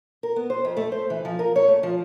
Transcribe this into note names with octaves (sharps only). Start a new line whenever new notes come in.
A#4
B3
C5
F2
A3
C5
E3
F3
A#4
C#5
A3
F3